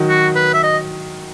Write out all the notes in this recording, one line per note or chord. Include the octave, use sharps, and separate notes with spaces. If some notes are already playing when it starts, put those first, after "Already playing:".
Already playing: D#3 F#3
F#4
B4
E5
D#5